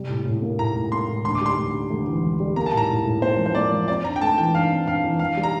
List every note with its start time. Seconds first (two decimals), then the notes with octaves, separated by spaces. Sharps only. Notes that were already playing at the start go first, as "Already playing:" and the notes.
Already playing: C3 G3
0.09 A2
0.26 A2
0.42 A#3
0.59 A2 A#5
0.75 A2
0.92 A#3 C6
1.09 A2
1.24 D2 C6
1.35 D6
1.41 G3 C6
1.57 D2
1.74 G3
1.91 D2
2.07 E3
2.23 D2
2.40 G3
2.56 A#3 A#5
2.66 A5
2.73 A2 A#5
2.89 A2
3.05 A2
3.22 A#3 C5
3.39 F3
3.46 C5
3.55 A#3 D5
3.72 F3
3.88 C4 D5
4.04 G2 A#5
4.16 G5
4.21 A3 A5
4.38 E3 G5
4.54 G2 F5
4.71 C4
4.87 G2 F5
5.04 E3
5.19 E3 F5
5.37 G3
5.43 A#5